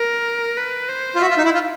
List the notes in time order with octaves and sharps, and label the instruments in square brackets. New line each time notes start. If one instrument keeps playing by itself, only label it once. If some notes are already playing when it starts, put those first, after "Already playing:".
Already playing: [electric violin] A#4
B4
C5
[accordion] F4
[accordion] F#4 [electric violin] E5
[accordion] F4
D#4
E4
F4